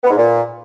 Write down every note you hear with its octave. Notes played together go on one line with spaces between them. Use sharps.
B3
G#2
A#2